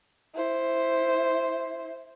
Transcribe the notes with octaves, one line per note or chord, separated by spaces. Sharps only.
E4 C5